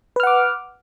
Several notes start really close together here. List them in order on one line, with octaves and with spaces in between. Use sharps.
B4 F6 F#5 D6